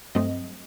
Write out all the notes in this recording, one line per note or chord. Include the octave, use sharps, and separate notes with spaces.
G2 F#3 A3 C4 D#5